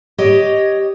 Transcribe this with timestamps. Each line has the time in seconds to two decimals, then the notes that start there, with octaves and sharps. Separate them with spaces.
0.18 G4 C#5 D#5